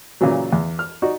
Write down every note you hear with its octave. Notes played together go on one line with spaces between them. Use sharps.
A#2 C#3 E3 F#3
E2
F6
D#4 F#4 D5